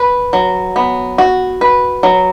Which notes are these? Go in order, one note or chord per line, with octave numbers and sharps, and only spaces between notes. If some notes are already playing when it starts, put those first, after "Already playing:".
Already playing: B4
F#3
B3
F#4
B4
F#3